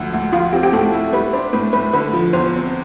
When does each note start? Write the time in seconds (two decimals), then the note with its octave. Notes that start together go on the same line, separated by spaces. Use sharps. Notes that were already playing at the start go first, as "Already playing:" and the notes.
Already playing: D2 D3 F3
0.13 D2
0.33 F3 F4
0.53 C4 G4
0.63 G4
0.72 A2 A4
0.93 E4
1.13 G3 B4
1.33 D4 C5
1.53 A2 B4
1.73 A2 B4
1.93 D3 B4
2.13 F3
2.33 E2 C5
2.54 C4